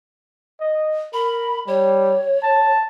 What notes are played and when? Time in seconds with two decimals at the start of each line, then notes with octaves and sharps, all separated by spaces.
0.61 D#5
1.13 A#4 B5
1.67 G3 C#5
2.43 A5